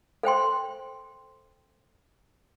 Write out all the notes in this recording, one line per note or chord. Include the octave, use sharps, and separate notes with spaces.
A4 C5 G5 C6